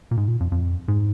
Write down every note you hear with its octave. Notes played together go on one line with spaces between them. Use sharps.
A#2
G#2
A#2
F2
F2
G#2